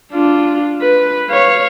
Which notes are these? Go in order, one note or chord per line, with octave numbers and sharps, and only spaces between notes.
D4 F4
B4
C#5 F5